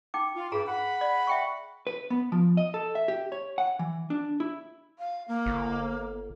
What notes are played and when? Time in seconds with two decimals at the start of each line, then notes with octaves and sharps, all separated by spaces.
0.14 D#4 G5 D6
0.36 F4
0.52 G2 G#4 A#5 B5
0.68 F#5 B5
1.01 D5
1.27 E5 G5 C#6
1.87 B4
2.10 B3
2.32 F3
2.57 D#5
2.74 A4
2.95 E5
3.08 G4
3.32 C#5
3.58 F#5
3.79 E3
4.10 D4
4.40 E4
4.99 F5
5.28 A#3
5.46 G1